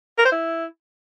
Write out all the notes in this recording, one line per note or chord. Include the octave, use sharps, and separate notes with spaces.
A#4
C5
E4